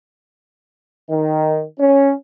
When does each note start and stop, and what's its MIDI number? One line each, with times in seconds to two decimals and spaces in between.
1.10 1.62 51
1.79 2.12 61